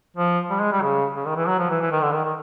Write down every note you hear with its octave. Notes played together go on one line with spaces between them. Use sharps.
F3
G3
G#3
G3
C#3
C#3
D#3
E3
F#3
F3
E3
E3
D#3
D3
D#3
D#3